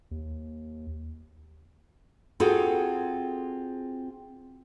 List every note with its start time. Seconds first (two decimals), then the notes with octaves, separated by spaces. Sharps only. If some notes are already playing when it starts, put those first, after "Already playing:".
0.11 D#2
2.40 C4 F4 F#4 G#4 A4